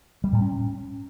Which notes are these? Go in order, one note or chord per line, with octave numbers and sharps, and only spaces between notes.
G3
A2
C#4